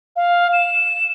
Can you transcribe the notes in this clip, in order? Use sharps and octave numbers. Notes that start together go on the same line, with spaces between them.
F5
E7